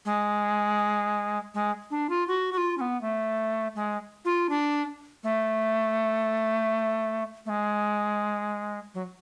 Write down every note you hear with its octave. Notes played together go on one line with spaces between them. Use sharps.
G#3
G#3
D4
F4
F#4
F#4
F4
C#4
B3
A3
G#3
F4
D4
A3
A3
G#3
F#3